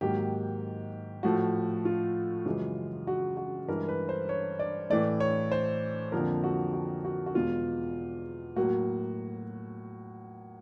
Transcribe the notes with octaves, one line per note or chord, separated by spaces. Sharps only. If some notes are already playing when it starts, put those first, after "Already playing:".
G#2 D#3 F#3 A#3 G4
A2 F3 A3 F#4
F4
F#2 C#3 E3 G#3
F#4
F#4
G2 E3 G#3 A#4
B4
C5
C#5
D5
A2 E3 A3 D5
C#5
C5
F2 D3 F3 A#3 A#4
F#4
F#4
F#4
F#4
E2 B2 G#3 F4
A2 F#3 A#3 F#4